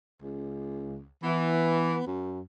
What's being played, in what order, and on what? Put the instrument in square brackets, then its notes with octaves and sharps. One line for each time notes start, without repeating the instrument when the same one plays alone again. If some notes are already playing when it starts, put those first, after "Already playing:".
[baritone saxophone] C#2
[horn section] E3 [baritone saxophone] B3
[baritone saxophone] F#2